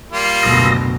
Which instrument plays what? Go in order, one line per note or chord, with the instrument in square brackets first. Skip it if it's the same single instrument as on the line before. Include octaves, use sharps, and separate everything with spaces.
[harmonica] G3 A#3 F4
[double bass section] F#1 D2 B2 [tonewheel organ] D#6 E6 A#6